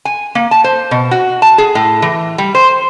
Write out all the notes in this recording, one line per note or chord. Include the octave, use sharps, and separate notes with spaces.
G#5
A#3
A5
C5
B2
F#4
A5
G#4
A2
E3
G3
C5